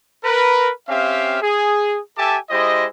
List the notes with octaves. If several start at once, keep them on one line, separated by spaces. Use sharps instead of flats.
A#4 B4
C4 C#4 G4 E5 F5
G#4
G4 A4 E5 G#5 A5 D6
G#3 E4 G4 C5 D#5